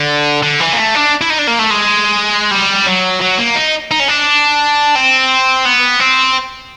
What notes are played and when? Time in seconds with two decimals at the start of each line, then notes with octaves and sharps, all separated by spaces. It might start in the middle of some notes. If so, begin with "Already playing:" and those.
Already playing: D3
0.43 D3
0.60 E3
0.73 A#3
0.78 A3
0.95 D4
1.21 E4
1.30 D#4
1.39 D4
1.47 A#3
1.59 A3
1.70 G#3
2.51 G3
2.87 F#3
3.22 F#3
3.39 A#3
3.56 D#4
3.91 D#4
4.00 C#4
4.08 D4
4.95 C4
5.65 B3
6.00 C4